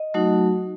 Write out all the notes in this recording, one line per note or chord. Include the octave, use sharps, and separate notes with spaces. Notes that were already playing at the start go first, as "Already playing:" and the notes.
Already playing: D#5
F#3 A3 D#4 F#4